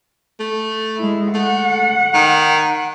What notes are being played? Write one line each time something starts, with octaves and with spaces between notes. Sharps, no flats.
A3
G#3 E4
A3 F#5
D#3